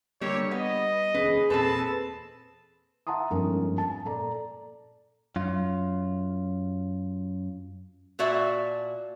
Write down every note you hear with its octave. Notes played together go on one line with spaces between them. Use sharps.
D3 G3 A#3 G4 C#5
B3 D#5
F1 D#2 C#4 G#4 B4
E2 A#2 C4 A4 B4 A5
E5 F#5 A5 A#5 C6 D#6
G1 F2 G#2 C#4 A#4
A5
A#2 A#3 A4 D5 A#5
F#2 F4
A#2 F#4 D5 E5 A5